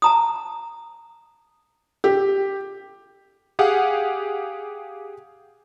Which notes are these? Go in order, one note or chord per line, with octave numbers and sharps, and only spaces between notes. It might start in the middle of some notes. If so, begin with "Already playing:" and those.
A5 A#5 D#6
G4
G4 G#4 F5 F#5